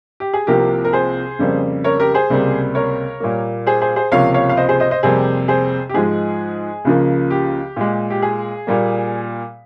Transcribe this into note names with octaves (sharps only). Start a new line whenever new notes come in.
G4
G#4
C2 C3 F3 A#3 G4 A#4
A#4
G#4 C5
F2 C#3 G3 A#3
A#4 C#5
G4 A#4
G#4 C5
C#2 C3 G3 A#3
A#4 C#5
A#2 G3 A#3
G#4 C5
G#4 C5
G#4 C5
C#2 C3 F3 A#3 C#5 F5
C#5 F5
F5
C5 D#5
G#4 C5
C5 D#5
C5 D#5
F2 C3 G3 A#3 G#4 C5
G#4 C5
G4
G#2 F3 G#3 G#4
C#2 C#3 F3 A#3
G4
A#2 G#3
G4
G#4
A#2 G3 A#3